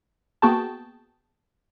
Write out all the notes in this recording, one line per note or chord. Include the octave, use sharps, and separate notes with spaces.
A#3 B3 F#4 G#4 G5 A5